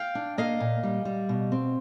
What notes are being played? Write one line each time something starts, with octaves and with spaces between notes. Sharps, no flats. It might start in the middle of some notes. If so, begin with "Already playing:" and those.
Already playing: F5 G5
D4
A#3 D#5 F5
A#2
G3
G3
B2
C4